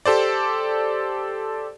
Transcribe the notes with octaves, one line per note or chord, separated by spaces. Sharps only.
G4 A4 C5 D5